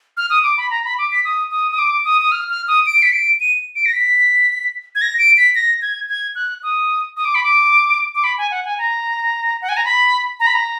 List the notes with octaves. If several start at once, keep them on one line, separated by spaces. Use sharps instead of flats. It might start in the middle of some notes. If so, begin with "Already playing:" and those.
F6
D#6
D6
B5
A#5
B5
D6
B6
D#6
D#6
D#6
D6
D#6
D#6
F6
F6
D#6
D7
B6
D7
D#7
D7
A#6
B6
G#6
A#6
D7
B6
A#6
G#6
G#6
F#6
D#6
D#6
D6
B5
D6
D6
B5
G#5
F#5
G#5
A#5
F#5
G#5
A#5
B5
A#5
B5
A#5